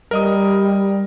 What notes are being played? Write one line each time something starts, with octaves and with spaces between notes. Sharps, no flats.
G3 A#4 D#5 D#6